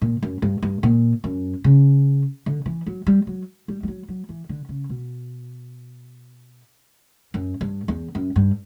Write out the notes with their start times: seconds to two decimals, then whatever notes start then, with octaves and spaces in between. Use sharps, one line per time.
0.02 A#2
0.23 F#2
0.42 G2
0.63 G2
0.83 A#2
1.24 F#2
1.64 C#3
2.46 D3
2.66 E3
2.86 F#3
3.07 G3
3.27 F#3
3.68 G3
3.83 G3
3.88 F#3
4.08 F#3
4.29 E3
4.49 D3
4.69 C#3
4.89 B2
7.34 F#2
7.61 G2
7.88 E2
8.15 F#2
8.36 G2